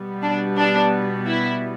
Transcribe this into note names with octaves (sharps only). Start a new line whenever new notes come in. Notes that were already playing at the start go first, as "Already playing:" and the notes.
Already playing: B2 G3 B3
D4
D4
E4